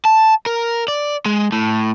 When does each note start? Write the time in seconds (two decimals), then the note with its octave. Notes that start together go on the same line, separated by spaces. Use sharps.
0.05 A5
0.46 A#4
0.88 D5
1.26 G#3
1.52 A2